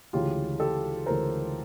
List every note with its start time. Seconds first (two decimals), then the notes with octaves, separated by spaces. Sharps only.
0.13 D2 C#3 E3 G#3 F4 G4
0.60 G4 A4
1.06 D2 C#3 E3 G#3 A#4 C5